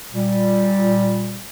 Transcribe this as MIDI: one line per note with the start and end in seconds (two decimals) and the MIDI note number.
0.13 1.42 46
0.13 1.42 55